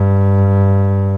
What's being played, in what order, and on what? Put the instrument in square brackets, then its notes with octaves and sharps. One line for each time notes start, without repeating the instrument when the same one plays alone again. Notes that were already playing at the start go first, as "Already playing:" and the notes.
Already playing: [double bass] G2